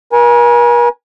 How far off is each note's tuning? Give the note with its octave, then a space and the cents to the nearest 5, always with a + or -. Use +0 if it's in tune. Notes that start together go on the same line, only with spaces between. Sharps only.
A#4 +45 G#5 +0